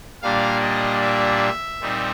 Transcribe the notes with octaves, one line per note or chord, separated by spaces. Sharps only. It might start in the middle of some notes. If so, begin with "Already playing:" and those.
A#2 G3 A#3 D4 F5
D#5
E5
A#2 G3 C4 D#4